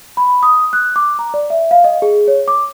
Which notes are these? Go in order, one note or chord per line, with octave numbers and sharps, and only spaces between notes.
B5
D#6
F#6
D6
A#5
D5
E5
F5
D#5
G#4
C#5
D6